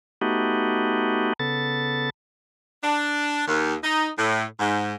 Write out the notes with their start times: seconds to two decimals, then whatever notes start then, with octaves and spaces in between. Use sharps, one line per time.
0.21 A3 B3 D#4 F#4 G4
1.40 C#3 B3 A4 A6
2.83 D4
3.47 D#2
3.83 D#4
4.18 A2
4.59 G#2